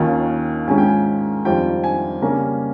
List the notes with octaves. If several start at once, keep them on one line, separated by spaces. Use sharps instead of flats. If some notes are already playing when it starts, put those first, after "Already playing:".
Already playing: D#2 D#3 A#3 C#4 F4
G#2 D#3 G#3 C#4 F4 G#5
G5
G#5
F2 D#3 G3 C4 F4 G5
G#5
C#3 G3 A#3 C#4 A#5